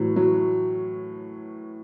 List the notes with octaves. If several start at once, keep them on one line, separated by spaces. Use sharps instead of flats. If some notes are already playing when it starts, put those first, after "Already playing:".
Already playing: A2 E3 F#3
F#3